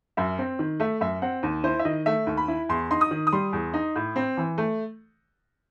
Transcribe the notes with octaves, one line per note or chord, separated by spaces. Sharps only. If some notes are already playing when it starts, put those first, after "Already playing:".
F#2 E5
C4
D#3
A3 E5
F#2 E5
C4 F#5
D#2
E4 C5
E5
D#3 D#5
A3 E5
D#2
B5
E4
E2 C6
D#4 C6
D#6
D#3
D#6
G3 C6
E2
D#4
A2
C4
E3
A3